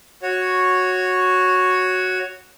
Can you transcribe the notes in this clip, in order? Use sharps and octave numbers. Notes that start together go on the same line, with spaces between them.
F#4 C#5